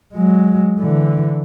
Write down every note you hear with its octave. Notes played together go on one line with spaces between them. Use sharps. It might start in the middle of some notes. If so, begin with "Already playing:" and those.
F#3 G#3
D3 E3